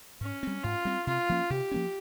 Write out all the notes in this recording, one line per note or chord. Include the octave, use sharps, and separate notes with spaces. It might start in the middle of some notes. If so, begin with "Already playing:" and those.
G#2 C#4
G3 C4
G#2 F4
G3 C4
C3 F4
F3 A#3 C#4
C3 G4
F3 A#3 C#4